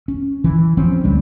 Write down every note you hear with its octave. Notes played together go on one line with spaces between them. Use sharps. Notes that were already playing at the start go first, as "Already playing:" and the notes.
C#4
E3
F3 C4 C#4
D2 G3 D4